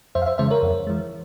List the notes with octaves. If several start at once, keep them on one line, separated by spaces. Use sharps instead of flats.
F2 C5 E5
F5
C5 E5
C#3 E3 G#3 C5 E5
A#4 C#5
F2
E3 G#3